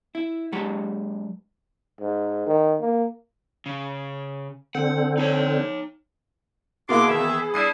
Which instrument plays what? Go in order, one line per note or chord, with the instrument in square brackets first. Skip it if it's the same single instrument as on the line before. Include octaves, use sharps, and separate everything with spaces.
[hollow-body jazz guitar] E4
G#2 F#3 G#3 G4 F#5
[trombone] G#2
D#3
A#3
[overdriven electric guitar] C#3
[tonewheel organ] D3 C4 [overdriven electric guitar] F#5
[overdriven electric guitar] D#4 C#5
[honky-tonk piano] B2 A#3 E4 [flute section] G#4 [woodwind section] F#5 C6 D6
[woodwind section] D#3 E3 E5
[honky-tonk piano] B3
[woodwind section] G3 D4 E4 [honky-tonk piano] D#6 C7 D#7